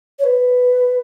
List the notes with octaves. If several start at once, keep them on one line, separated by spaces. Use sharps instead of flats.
C#5
B4